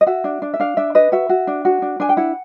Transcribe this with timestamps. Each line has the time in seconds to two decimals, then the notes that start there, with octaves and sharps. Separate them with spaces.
0.01 D#5
0.07 F#4 E5
0.24 D4
0.42 D4
0.54 E5
0.60 D4 F5
0.77 D4 E5
0.95 B4 D#5
1.12 F#4 E5
1.29 F#4
1.47 D4
1.65 F#4
1.82 D4
2.00 D4 G#5
2.09 G5
2.17 E4 F#5